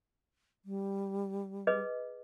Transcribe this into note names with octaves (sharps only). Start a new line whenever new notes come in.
G3
G#4 B4 D#5